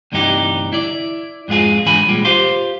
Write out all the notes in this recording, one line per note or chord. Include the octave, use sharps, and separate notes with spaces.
D2 G2 C3 E3 D#4 G4
E4 D5
F2 G#2 G#3 F4 G#4
G#2 D3 E3 G#5 B5
A#2 G3 G#3 F4
F4 G4 C5 F5 C6